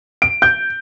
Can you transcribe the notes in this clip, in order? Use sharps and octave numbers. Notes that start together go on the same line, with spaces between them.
D7
G6